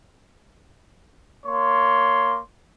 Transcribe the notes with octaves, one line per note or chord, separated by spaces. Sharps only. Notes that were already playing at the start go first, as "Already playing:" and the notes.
A#3 C#5 C6